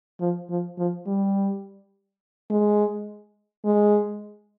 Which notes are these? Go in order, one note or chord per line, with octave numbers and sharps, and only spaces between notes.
F3
F3
F3
G3
G#3
G#3